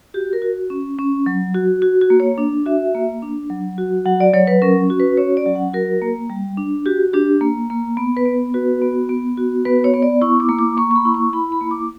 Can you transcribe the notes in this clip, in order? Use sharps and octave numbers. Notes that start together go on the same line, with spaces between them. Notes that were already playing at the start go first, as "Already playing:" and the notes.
F#4 G4
A#4
F#4
C#4
C#4
F#3
F#4
F#4
F#4
A#3
C#5
D4
F#4 E5
A#3
D4
F#3
F#4
F#3 F#5
D5
F#3 C#5
B4
C#4 A#4
F#4
B4
C#4 C#5
D5
F#3
F#5
F#4 A#4
A#3
G3
D4
F#4 G4
D4 G4
A#3
A#3
B3
B4
B3
F#4 B4
B3
B3
F#4
B3 B4
C#5
B3
D5
E4 C#6
D6
A#3
D6
A#3 C#6
C#6
B5
E4
C#6
E4 B5
B5
A#3
D6